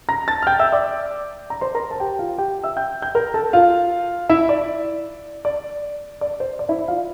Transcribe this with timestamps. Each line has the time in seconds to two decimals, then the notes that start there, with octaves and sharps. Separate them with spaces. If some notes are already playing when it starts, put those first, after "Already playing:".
0.09 A#5 A#6
0.28 A5 A6
0.43 F6
0.47 G5 G6
0.59 E5 E6
0.72 D5 D6
1.50 A#5
1.61 C5 C6
1.75 A#4 A#5
1.91 A5
2.00 G4 G5
2.19 F4 F5
2.38 G4 G5
2.64 E5 E6
2.77 G5 G6
3.02 G5 G6
3.15 A#4 A#5
3.34 A4 A5
3.53 F4 F5
4.29 E4 E5
4.49 D5
5.45 D5
6.21 D5
6.40 C5
6.59 D5
6.69 E4 E5
6.79 D5
6.88 F4 F5